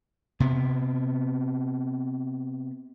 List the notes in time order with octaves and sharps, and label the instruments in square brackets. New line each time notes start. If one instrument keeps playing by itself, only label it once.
[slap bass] C3 B3